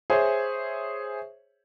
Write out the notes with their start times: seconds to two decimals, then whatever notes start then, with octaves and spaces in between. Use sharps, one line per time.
0.10 G#4 C5 C#5 E5